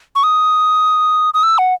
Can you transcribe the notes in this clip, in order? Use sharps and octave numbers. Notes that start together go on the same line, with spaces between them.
C#6
D#6
D#6
E6
F#5